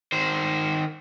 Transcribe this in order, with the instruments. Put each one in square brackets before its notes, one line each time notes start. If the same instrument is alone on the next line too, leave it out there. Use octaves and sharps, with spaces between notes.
[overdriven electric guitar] D#3 C5